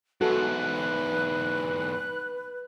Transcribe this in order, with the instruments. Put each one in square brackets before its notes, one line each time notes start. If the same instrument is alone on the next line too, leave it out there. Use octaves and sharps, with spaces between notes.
[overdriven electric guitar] E2 G#2 [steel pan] F#4 A4 [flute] B4 [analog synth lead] F#6